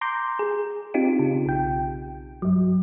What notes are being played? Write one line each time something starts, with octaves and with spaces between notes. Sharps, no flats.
A#5 C6 D6 G6
G#4
C4 D#4 F4 G4 D7
C#3
B1 G5
G2 F#3